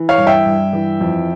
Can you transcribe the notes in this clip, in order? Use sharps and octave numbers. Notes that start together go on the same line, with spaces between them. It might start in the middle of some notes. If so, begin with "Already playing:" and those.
Already playing: E3
C#5 F5
G2
E5 G5
G2
E3
F2